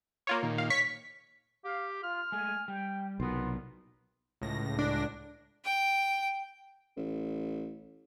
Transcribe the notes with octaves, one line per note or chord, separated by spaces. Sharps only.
A#3 F4 C#5
A#2 D#3
F5
C#5 C#6 B6
G4 F5
F4 F6
G#3 A3 G#5
G3 G5
B1 C3 B3 F4 A#4
C#2 A2 A#6
D4
G5
A1